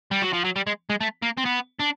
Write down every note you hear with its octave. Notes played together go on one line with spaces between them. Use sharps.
G3
F#3
F3
F#3
G3
G#3
G#3
A3
A#3
C4
B3
D4